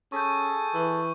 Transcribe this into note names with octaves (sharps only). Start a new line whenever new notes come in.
C#4 G#4 A4 C#6 G6
E3